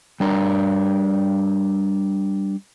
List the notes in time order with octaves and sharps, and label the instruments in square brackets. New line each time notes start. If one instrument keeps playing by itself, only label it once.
[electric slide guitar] G3 D4 A#4